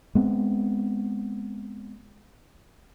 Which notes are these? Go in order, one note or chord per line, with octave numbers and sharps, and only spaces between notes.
G#3 B3 C4